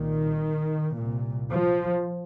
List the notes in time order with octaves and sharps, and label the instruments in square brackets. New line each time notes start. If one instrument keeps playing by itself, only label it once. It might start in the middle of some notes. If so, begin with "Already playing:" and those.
Already playing: [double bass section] C2 A#2 D#3
C2 A#2
F3